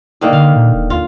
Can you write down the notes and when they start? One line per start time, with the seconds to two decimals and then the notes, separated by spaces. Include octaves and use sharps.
0.21 D3 D#3 A#3
0.33 D3 F5
0.56 A#2
0.72 D#1
0.90 D#2 F4